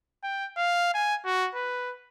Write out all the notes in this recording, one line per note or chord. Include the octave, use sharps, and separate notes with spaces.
G5
F5
G#5
F#4
B4